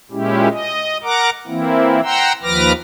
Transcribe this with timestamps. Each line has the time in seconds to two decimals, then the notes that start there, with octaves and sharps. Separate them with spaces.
0.11 A#2 G#3 C#4 E4 G4
0.51 D#5
1.03 A#4 F#5 A#5 D6
1.47 E3 A#3 C4 E4
2.03 F#5 G5 A#5 C6 E6
2.43 D#2 F3 B4 D6 F6 A#6